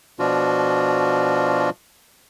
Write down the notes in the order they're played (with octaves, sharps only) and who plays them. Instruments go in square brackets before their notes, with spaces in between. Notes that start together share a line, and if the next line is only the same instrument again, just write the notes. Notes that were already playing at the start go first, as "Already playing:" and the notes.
[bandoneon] B2 F3 D4 F4 F#4